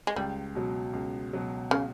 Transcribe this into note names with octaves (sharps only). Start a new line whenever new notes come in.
G#3
C#2 G3
B2 F#3
C#2
B2 F#3
C#3